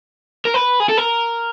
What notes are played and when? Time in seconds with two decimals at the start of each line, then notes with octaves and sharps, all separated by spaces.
0.45 A#4
0.54 B4
0.80 G#4
0.89 A4
0.98 A#4